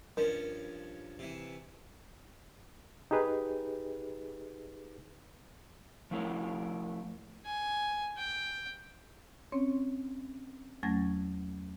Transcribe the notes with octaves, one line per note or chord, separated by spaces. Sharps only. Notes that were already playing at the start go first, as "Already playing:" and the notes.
G2 F3 C#4 A#4
C3 E3
D#4 G4 G#4 B4
F3 A3 E4 A#4 C#5
G#5
G5
C4 C#4 C#5
E2 F#3 A3 C#4 G#6 A#6